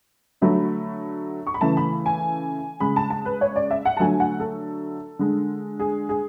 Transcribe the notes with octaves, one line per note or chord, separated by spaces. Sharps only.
D3 F#3 A3 B5
C#6
B5
C#3 E3 A3 A5
B5
G#5
C#3 G#3 B5
A5
A5
B4
C#5
D5
E5
F#5
A5
D3 F#3 A3 G#5
F#5
A4
D3 G#3
G#4
G#4